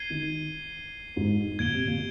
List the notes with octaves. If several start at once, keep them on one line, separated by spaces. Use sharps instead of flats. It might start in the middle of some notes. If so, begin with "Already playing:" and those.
Already playing: G#6 C7 D#7 G7
D#3
G#2
A#2 G#6 D7 G7
C3
A#2